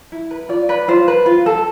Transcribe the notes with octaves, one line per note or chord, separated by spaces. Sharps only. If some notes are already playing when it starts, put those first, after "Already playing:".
E4
B4
F4 D5
B4
F4 C5
B4
F4
A4